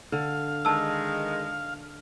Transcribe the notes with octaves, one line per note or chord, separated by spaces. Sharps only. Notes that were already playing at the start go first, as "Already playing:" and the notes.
D3 F5
D#3 G#3 A5 E6